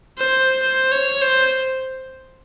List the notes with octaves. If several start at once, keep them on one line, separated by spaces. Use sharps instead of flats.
C5
C5
C#5
C5